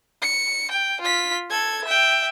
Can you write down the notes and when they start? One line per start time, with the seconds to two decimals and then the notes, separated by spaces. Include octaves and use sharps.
0.22 C#7
0.71 G5
1.01 F4 B6
1.50 A4 G#6
1.84 E5 G5